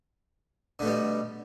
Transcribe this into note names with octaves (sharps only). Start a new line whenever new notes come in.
B2 D3 G3 A3